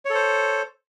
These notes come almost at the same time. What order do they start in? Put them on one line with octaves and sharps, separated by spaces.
C#5 A4 C5